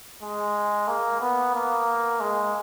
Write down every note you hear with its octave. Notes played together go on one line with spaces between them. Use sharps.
G#3
A#3
B3
A#3
G#3